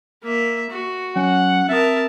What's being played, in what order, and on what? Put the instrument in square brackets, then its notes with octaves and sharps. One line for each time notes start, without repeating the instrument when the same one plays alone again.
[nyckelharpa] A#3 E5
F#4
[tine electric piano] F#3 C#4 [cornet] F#5
[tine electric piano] C4 D#6 [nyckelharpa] A#4 A5 [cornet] E5